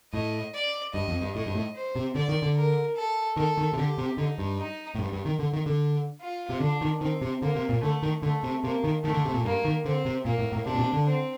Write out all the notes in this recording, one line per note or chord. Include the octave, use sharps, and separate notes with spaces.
A2 D#5
D5
G2 D#5
F2
G2
A2 D#5
G2
A2
C5
C3
D3 D5
D#3
D3
A#4
A4
D#3 A4
D#3
C3
D3 G4
C3
D3 D#4
G2
D#4
A2
G2
G2
D#3
D3
D#3
D3
F4
C3
D3 D4
D#3
D#3 C4
C3
D3 A#3
C3
A#2
D3 A3
D#3
D3 A3
C3
C3 A#3
D#3
D#3 A3
D3
C3
A#2
G2 A#3
D#3
D3 C4
C3
A#2 A#3
A2
A2
C3 D4
A#2
C3
D3
C4